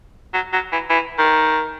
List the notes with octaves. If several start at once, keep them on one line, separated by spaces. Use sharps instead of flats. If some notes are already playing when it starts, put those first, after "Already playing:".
F#3
F#3
E3
E3
D#3